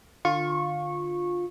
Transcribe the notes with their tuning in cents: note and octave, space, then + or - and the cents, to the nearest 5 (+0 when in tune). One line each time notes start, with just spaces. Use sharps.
D3 +25 F4 +15 C#6 -15